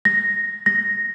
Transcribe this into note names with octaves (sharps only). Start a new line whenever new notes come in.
A#6
A#6